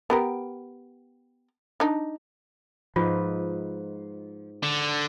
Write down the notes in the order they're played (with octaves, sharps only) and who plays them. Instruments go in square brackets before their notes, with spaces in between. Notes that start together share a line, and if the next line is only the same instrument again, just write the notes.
[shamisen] B3 G4 A#4
D4 D#4
[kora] G#2 D#4 B4 [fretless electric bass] F3 [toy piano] F4
[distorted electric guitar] D3